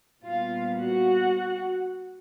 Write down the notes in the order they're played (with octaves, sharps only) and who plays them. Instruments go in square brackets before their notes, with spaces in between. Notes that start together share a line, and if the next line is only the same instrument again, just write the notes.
[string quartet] A#2 G3 B3 F4 F5
F#4 F#5